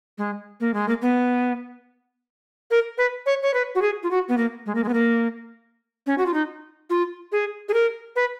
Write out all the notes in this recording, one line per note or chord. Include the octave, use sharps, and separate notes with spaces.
G#3
A#3
G#3
A#3
B3
A#4
B4
C#5
C#5
B4
F#4
G#4
F4
F#4
B3
A#3
G#3
A#3
G#3
B3
A#3
C#4
F#4
F4
D#4
F4
G#4
G#4
A#4
B4